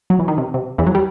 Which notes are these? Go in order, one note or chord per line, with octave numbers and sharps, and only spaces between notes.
F#3
E3
D#3
C3
C3
E2 E3
F#3
G3